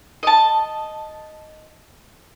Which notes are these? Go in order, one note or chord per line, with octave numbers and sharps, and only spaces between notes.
D#5 A5